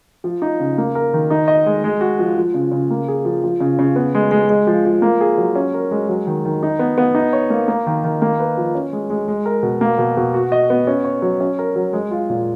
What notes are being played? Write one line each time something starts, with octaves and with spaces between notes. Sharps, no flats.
F3
D#4
C#3
A#3
A#4
D#3
D#4
D#5
G#3
G#3
F#4
F3
F3
C#3
C#3
A#3
G#4
F3
F3
C#3
C#3
B3
G#3
G#3
G#3
F3
F3
A#3
G#4
F#3
C#4
A#4
G#3
F#3
D#3
D#3
D#4
B3
B3
D#4
C#5
A#3
A#3
D#3
D#3
A#3
B4
F3
C#4
G#3
G#3
G#3
A#4
B2
A#3
B2
B2
F#4
D#5
B3
C#4
C#5
F#3
C#4
A#4
F#3
G#3
F4
A#2